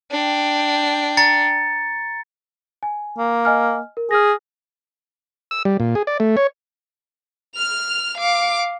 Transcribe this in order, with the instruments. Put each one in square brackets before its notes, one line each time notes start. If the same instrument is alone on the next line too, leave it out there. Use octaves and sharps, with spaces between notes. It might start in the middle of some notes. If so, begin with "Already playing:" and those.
[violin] D4 G5
[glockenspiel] A#5 A6 C#7
[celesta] G#5
[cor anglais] A#3
[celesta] D#5 G#5 F6
A#4
[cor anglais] G#4 [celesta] F6 A#6
[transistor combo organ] E6
G3
A#2
G#4
D5
A3
C#5
[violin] F6 F7
F5 D6